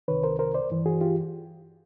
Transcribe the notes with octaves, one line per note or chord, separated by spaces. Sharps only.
C2 C3 D#3 B4 C#5
A#4 C5
A#4 C5
C5 D5
G2 E3
F#4 G#4
F4 G4